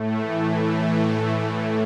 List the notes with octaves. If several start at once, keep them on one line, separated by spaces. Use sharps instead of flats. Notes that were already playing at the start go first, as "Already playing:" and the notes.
Already playing: A2 A3
E3